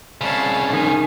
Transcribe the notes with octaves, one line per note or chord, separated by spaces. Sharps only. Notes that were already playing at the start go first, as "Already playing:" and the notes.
C2 C#3 C#5 F5 A5
D#3 G#5